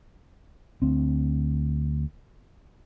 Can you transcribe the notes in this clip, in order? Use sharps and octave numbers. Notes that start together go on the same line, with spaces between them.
D2 C4